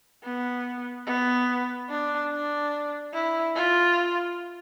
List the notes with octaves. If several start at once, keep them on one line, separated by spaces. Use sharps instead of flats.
B3
B3
D4
D4
E4
F4